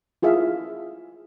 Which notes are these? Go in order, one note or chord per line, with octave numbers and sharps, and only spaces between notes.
E4 F4 G#4 E5 F5